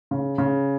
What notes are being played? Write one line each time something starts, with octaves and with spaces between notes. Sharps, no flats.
C#3
C#3